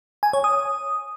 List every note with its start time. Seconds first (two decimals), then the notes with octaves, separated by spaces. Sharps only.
0.23 G#5
0.33 C#5
0.44 D#6